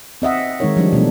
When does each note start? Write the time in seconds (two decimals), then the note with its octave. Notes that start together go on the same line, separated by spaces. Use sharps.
0.22 C4 D#5 E5 F#5
0.60 D#3 G#3 C4 D#4 A#4 C#5
0.76 F3 G3 D4
0.93 B2 E3 A3 D4